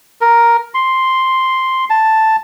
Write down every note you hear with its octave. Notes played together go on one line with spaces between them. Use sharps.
A#4
C6
A5